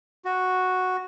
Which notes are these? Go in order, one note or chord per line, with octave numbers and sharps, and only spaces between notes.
F#4